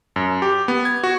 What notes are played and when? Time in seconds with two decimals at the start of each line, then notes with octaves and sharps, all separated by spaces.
0.16 F#2
0.42 G4
0.68 B3
0.85 G#6
1.04 F#4